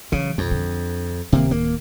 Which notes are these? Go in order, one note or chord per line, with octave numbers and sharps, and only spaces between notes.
C#3 E3 F#3
B1 F2 D#3
D3
D1 C3 D#3 A#3
A#3